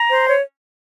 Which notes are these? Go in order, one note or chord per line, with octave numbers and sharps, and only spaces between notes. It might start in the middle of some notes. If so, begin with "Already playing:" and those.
Already playing: A#5
C5
C#5